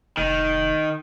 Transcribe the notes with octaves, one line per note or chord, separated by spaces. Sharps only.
F1 D#3